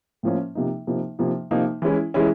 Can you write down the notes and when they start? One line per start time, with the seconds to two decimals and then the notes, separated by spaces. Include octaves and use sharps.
0.23 A2 F3 A#3 C#4
0.55 C3 F3 A#3 D#4
0.87 C3 F3 A#3 D#4
1.19 C3 F3 A#3 D#4
1.51 C3 F3 A#3 D#4
1.82 E3 G#3 C#4 E4
2.14 E3 G#3 C#4 E4